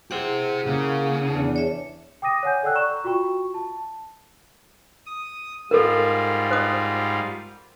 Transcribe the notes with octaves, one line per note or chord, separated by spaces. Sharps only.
E4 G4 G#4 C5 F#5
C#3 A#3
E2 D4
C#5 E5
G5 D6 D#6 A#6 D#7
C#5 F#5 G#5 G6
A4 D5 F#5 G5 E6 F#6
A#5 C#6 E7
F4 F#4 G5 C#6
A5
D#6
G#2 G3 F4 A4 A#4
C5 D#6